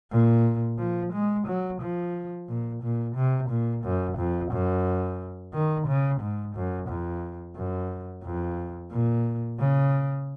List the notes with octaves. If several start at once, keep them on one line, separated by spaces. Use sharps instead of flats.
A#2
F3
G#3
F#3
F3
A#2
A#2
C3
A#2
F#2
F2
F#2
D#3
C#3
G#2
F#2
F2
F#2
F2
A#2
C#3